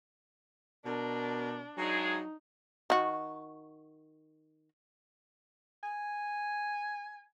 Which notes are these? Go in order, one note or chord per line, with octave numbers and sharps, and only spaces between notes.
B2 D4 A#4
G2 F#3 G#3 D#4 G#4
D#3 F#4
G#5